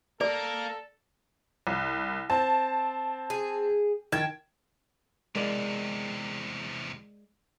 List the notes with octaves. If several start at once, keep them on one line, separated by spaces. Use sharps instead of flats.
A#3 A4 A#4 D5
C2
C4 A5
G#4
D#3 G5 A5 G#6
E2 C3 G#3 A#4 D5